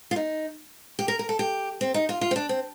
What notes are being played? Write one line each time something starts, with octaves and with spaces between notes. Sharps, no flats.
F4
D#4
G4
A#4
A#4
A4
G4
C4
D#4
F4
F4
C4
D4
C4